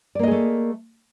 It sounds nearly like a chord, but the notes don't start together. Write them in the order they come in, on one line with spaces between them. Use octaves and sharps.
D5 A#3 D#5 G#4 A3